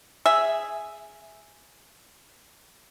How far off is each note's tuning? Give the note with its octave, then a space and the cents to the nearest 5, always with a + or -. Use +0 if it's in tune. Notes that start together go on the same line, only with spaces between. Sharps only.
G#4 +0 E5 +0